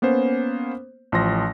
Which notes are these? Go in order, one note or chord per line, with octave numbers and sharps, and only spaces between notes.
A#3 B3 C#4 C5
A1 F3 C6 A#6